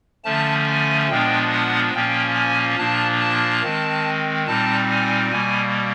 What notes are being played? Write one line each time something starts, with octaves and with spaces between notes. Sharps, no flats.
D3 F3 A3 C#4 A5
G#5
A#2 F3 G#3 B3 D4 G5
F#5
A#2 F3 A#3 C#4 G5
G#5
A#2 F3 A#3 D4 A5
A5
D#3 G#3 C4
A#2 G3 C4 D#4 A5
G#5
B2 G3 A#3 G#5